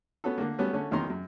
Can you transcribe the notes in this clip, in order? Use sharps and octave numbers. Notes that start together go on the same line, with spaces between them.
B3 C#4 F#4 A4
D3 A#3
F#3 G3 A3 B3 C#4
D3 A3 C#4
B1 E2 D#3 C#4 A#5 C6
F#2